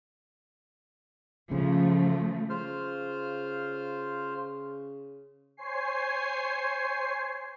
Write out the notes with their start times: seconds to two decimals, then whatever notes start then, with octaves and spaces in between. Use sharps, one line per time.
1.51 C#3 F3 A3
2.50 C#3 F4 C5 F6
5.57 C5 C#5 G#5 C7